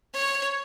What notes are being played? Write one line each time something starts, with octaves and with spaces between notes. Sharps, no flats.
C#5